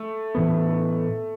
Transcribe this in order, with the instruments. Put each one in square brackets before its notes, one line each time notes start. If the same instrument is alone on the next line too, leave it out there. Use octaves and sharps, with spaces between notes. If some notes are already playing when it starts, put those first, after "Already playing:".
Already playing: [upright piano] A3
[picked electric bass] A2 E3 B3